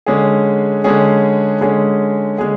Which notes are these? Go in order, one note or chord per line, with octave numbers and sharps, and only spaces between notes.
D3 G#3 C#4 G#4
D3 G#3 C#4 G#4
D3 G#3 C#4 G#4
D3 G#3 C#4 G#4